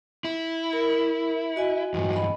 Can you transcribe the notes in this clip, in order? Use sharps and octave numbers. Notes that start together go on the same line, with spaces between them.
E4
A#4
F#4 D#5 G#5
E2 G2
D#5 B5